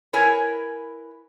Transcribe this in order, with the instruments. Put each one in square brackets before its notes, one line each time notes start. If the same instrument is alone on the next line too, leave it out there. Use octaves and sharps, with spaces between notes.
[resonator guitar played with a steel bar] E4 A#4 B4 C#5 G#5